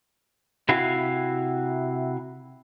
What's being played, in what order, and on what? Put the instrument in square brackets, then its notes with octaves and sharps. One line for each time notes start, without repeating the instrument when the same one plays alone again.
[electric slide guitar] C3 E4 F#4 F5